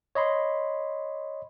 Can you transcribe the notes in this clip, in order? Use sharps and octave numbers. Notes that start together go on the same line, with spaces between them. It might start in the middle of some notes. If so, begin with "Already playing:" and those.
C#5 D#5 B5 C6